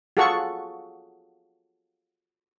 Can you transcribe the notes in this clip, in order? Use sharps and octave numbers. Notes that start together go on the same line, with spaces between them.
F4 F#4 G#4 A4 F#5 C#6